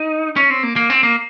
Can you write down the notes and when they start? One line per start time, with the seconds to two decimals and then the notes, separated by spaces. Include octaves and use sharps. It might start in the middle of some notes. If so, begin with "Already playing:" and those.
Already playing: D#4
0.36 C#4
0.50 C4
0.63 A#3
0.76 A#3
0.90 C4
1.03 A#3